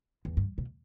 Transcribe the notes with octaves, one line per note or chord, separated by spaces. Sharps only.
E2
G2
B2